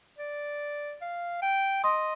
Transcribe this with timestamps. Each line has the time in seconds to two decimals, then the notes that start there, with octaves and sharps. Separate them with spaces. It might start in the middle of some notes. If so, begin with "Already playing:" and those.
0.18 D5
1.01 F5
1.42 G5
1.84 D#5 C6 D#6